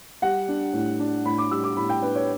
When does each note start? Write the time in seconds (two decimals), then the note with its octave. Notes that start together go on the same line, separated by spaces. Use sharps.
0.22 G3 F#5
0.48 D4
0.73 A2
0.99 D4
1.25 A2 B5
1.38 D6
1.51 G3 E6
1.64 D6
1.77 A2 B5
1.89 G5
2.02 D4 B4
2.15 C#5